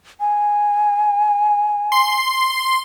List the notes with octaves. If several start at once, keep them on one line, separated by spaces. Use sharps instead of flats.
G#5
C6